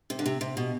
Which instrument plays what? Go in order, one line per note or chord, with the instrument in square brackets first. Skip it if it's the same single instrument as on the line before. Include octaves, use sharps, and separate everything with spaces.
[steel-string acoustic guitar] C3
D3
C3
C3
B2